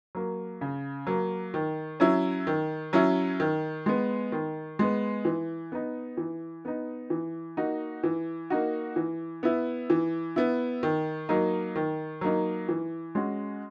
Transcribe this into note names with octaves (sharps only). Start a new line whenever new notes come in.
F#3 A#3
C#3
F#3 A#3
D#3
F#3 C#4 E4
D#3
F#3 C#4 E4
D#3
G#3 B3
D#3
G#3 B3
E3
B3 D#4
E3
B3 D#4
E3
A#3 D#4 F#4
E3
A#3 D#4 F#4
E3
B3 E4
E3
B3 E4
D#3
F#3 A#3 D#4
D#3
F#3 A#3 D#4
E3
G#3 C#4 F#4